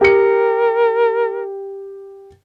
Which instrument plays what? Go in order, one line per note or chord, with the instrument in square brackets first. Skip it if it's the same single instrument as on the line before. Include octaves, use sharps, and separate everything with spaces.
[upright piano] G4 C#7 [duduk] A#4